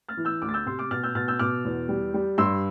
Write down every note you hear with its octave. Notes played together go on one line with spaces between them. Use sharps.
F6 A6
E3
E6 G6
D2 D6 F6
A6
E6 G6
C3 C6 E6
D6 F6
B2 F6 A6
E6 G6
B2 F6 A6
E6 G6
B2 D6 F6
E2
G3
G3
G2 C6 E6